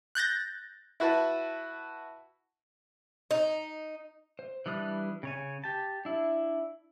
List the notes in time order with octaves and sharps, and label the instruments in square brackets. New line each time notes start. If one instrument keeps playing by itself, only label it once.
[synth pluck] F#6 G6 A6 A#6
[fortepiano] E4 F#4 B4 A5
[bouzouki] D#4
[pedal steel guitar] C5
E3 G3 D4 D#6 F#6
C#3 C#5 G#5
G4 A5
D4 E4